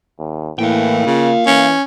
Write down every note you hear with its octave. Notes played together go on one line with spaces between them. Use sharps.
D#2
A2 E3 A#3 F5 G5
C#3 F4
E3 C#4